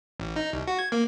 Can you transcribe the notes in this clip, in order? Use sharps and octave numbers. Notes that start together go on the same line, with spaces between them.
A1
D#4
C2
F#4
G#6
A#3